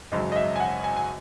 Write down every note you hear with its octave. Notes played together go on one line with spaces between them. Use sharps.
G#1 F#2 C#3 F#3 D#5
D#5
E5
G#5
F#5
G#5
G#5